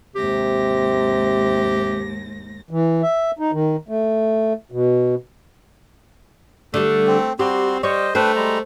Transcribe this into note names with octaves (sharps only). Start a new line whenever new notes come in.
D#2 G#2 C3 G4 A#6
E3
E5
D#4
D#3
A3
B2
D3 G3 A3
C4
G3 C4 F#4 G4 C6
G3 C5 C#5 D#5
A3 D4 B4 C5 G5
G3 G#3 A#5